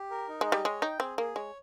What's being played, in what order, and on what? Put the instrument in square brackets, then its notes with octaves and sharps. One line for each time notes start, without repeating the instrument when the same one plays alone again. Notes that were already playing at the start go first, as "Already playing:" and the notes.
Already playing: [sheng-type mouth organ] G4
A#4
D#4
[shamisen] G#3
[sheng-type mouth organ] D#5
[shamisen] G3
[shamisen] G#3 [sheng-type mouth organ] C#5
[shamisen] D#4 [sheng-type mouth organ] G5
[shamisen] C4 [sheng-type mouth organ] G#4
[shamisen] A#3 [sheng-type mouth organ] G#4
[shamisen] G#3 [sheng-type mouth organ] C#5